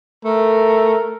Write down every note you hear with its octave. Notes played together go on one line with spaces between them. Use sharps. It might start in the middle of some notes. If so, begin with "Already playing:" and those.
A3 A#4